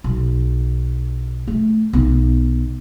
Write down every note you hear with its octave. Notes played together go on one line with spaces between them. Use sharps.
B1
A3
B1